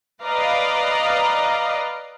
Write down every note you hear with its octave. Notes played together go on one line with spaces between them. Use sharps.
B4 D5 D#5 F5 A#5